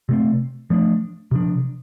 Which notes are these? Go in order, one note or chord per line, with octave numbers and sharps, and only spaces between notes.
C3 A3 C4
F3 A3 D4
C3 F3 D4